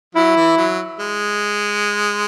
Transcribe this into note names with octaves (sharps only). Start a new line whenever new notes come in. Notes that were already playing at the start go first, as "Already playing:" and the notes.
F#3 E4
E3
F#3
G#3